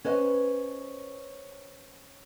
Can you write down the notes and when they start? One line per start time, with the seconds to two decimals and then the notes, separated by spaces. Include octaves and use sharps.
0.04 C#4 B4 C5 D#5